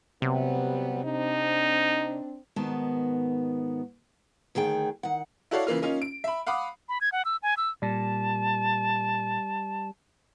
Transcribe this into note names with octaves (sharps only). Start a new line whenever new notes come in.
C3 F#3 G3 B3
C4 D4 D#4
G#2 B2 D#3 B3 A5
D2 D#3 G#4 G5
D#3 F#5
E4 F#4 A4 C#5 D5 F5
C#3 E3 A#3 F4
A#3 C#4 D#4 F4
D7
E5 B5
F5 F#5 B5 D6 D#6
B5
G#6
F#5
E6
G#5
E6
A#2 G3 A5